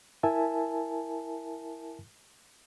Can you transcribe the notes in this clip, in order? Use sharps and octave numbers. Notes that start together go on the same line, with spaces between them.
E4 A#4 E5 G#5 A5